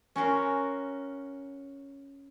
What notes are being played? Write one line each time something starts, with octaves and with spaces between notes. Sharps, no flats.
C#4 F#4 A#4 C6